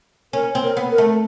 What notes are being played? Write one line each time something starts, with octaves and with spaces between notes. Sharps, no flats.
C#4 A#4
C4
A#4
B3
A#4
A3